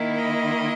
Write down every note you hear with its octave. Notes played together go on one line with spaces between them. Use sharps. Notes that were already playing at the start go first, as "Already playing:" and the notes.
Already playing: D#3 A#3 E4
D#5